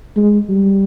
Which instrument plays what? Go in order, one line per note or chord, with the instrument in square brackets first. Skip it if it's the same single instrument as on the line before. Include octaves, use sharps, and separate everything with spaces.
[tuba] G#3
G3